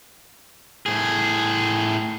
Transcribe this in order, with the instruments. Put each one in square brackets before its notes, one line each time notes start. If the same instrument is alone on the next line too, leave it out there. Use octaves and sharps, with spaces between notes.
[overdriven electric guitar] A2 G#4